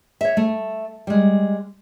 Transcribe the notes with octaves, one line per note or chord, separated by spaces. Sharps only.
C#5 E5
A3
G3 G#3